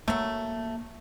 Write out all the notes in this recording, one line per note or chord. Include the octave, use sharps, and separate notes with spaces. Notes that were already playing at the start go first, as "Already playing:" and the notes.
F#3 A3 A#3